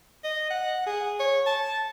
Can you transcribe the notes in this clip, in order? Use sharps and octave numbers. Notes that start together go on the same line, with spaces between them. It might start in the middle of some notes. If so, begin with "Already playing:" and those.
D#5
F#5
G#4
C#5
A5